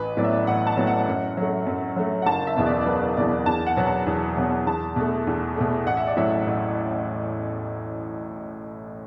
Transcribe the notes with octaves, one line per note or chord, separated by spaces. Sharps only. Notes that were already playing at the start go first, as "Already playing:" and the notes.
Already playing: A1 B4
A2 F#3 B3 D5
E5
D5
A1 F#5
A5
A2 F#3 B3
F#5
F#2
F#3 A3
F#2
F#3 A3
F#5
F#1 A5
E5
E2 B2 B3
D5
D5
F#1 B4
E2 B2 B3 D5
E2 A5
F#5
B2 F#3 B3
A5
E2
B2 F#3 B3
E2 A5
B2 A3
E2
B2 A3
A1 F#5
E5
D5
A2 F#3 E5
A1